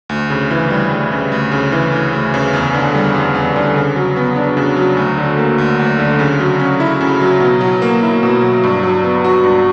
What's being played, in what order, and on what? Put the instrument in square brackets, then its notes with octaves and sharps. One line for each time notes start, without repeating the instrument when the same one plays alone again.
[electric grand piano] D2
C#3
E3
G3
D2
C#3
D2
C#3
E3
D2
D2
C#3
E2
D3
G3
E2
E2
D3
C#3
F#3
B3
D4
C#3
F#3
D2
D3
A#3
D2
D2
D3
C#3
F#3
C#4
E4
C#3
F#3
B2
F#3
A#3
E4
B2
F#3
G2
F#3
B3
F#4
G2